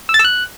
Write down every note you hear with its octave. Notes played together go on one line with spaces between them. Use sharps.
E6
A6
E6
F#6